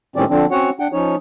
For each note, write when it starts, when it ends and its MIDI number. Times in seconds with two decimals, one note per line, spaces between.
0.16 0.25 45
0.16 0.25 51
0.16 0.25 55
0.16 0.25 60
0.16 0.25 61
0.16 0.25 74
0.30 0.46 50
0.30 0.46 53
0.30 0.46 60
0.30 0.46 62
0.51 0.70 60
0.51 0.70 61
0.51 0.70 66
0.51 0.70 73
0.51 0.70 78
0.79 0.88 62
0.79 0.88 78
0.79 0.88 79
0.93 1.16 53
0.93 1.16 61
0.93 1.16 63
0.93 1.16 73